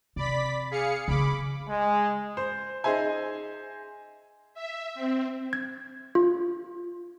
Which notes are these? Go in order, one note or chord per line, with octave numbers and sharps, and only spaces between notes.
C3 D5 B5 B6
G#4 F5 C#7
C#3 A#3 B5 D6
G#3
C5
D#4 G#4 C5 E5 G#5
E5
C4
G#6
F4